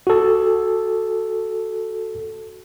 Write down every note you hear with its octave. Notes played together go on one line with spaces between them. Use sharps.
F#4 A4